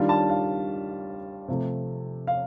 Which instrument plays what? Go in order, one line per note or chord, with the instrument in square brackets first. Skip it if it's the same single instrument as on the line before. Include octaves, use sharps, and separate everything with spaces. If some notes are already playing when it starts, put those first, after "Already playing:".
Already playing: [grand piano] D#3 G3 D4 F4
A5
F5
C3 F3 A3
F5